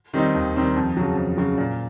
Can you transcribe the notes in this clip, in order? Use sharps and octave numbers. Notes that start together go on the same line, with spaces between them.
D#3 G3 C4 D#4
D#2
D#3 G3 C4 D#4
F2
C#3 F#3
F2
C#3 F#3
A#2